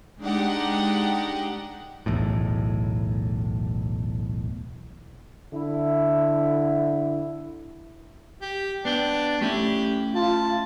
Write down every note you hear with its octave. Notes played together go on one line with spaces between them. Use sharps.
G#3 D4 D#4 G4 F#5
D1 B1 E2 A2
D3 E4
G4
B3 D4 G5
A3 C#4 E4 G4
F4 A5